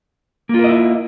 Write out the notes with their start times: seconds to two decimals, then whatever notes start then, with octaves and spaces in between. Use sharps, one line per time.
0.49 A#3
0.54 F4
0.59 A#4
0.64 D#5
0.69 E4